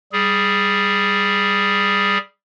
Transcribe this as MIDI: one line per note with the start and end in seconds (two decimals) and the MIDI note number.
0.12 2.18 55
0.12 2.18 68